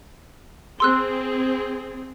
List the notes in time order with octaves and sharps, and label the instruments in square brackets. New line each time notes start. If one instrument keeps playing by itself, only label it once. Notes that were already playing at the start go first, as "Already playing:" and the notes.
[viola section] C4 G#4 [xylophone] C6 E6 F#6